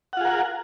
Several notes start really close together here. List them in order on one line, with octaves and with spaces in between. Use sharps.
F#5 F4 G#4 A#4